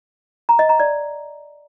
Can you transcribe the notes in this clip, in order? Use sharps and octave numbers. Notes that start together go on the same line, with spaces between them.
A#5
D#5
A#5
D5